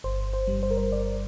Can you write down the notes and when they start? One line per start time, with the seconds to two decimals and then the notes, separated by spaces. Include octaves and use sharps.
0.04 G1 C5
0.33 C5
0.47 G2 G3
0.63 C5
0.71 A#4
0.77 C5
0.92 G1 D5